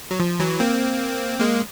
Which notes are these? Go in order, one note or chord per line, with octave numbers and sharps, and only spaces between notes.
F#3
F3
E3 F#3
A#3 C4
G#3 A#3